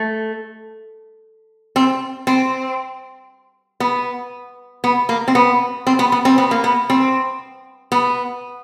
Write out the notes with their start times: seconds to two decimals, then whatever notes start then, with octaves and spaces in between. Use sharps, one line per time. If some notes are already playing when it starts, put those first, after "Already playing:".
Already playing: A3
1.76 C4
2.27 C4
3.80 B3
4.84 B3
5.09 A#3
5.28 C4
5.35 B3
5.87 C4
5.99 B3
6.12 B3
6.25 C4
6.38 B3
6.51 A#3
6.64 B3
6.90 C4
7.92 B3